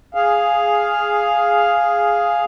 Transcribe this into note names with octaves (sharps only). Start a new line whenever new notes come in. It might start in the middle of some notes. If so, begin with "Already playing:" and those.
G#4 F5